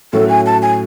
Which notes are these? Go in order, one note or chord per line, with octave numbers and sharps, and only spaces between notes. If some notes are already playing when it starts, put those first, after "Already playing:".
A2 F#3 A3 C#4 F#4 A4
G#5
A5
G#5